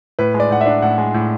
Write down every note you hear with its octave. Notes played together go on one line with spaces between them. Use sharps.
A2 B4
G#3
D5
A2 F#5
E5
D4
A2 F#5
G#3
A2